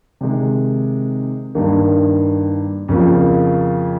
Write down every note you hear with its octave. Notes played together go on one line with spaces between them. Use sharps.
C3 D#3 G#3 D#4
G2 D#3 A#3
F2 C#3 F3 A#3 F4